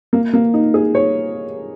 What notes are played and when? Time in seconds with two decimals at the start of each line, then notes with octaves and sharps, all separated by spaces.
0.13 A#3
0.33 A#3
0.54 D#4
0.74 G#4
0.95 C#5